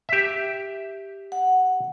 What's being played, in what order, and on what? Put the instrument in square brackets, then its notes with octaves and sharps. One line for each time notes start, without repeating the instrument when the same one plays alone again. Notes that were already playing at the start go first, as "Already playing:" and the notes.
[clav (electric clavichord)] G4 E5
[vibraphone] F#5